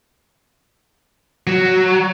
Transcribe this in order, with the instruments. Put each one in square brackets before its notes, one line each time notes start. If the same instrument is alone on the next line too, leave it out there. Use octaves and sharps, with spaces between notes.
[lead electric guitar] F#3